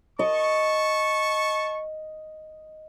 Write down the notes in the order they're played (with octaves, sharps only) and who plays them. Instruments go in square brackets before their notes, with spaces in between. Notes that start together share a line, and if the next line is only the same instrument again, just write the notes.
[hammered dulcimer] D#5 [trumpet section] A5 C#6